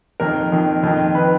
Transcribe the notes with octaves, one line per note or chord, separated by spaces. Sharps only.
F2 D#3 A#4
F2 D#3
F2 D#3
D#3 B4